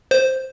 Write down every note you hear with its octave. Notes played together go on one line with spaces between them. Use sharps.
C5